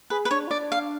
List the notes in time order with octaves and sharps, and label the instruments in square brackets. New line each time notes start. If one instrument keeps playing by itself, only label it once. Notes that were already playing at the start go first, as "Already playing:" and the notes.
[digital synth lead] G#4 [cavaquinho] B4
[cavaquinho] B4
[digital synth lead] D4 [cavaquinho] C#5
[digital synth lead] F4
[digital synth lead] D4 [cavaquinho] D5
[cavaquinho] F5